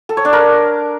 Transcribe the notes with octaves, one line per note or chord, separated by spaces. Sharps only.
A4
C#5
D4
A#4